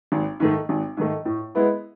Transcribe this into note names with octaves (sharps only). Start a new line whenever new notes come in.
G#1
G#2 D#3 A3
G#1
G#2 D#3 A3
A2
G#3 B3 E4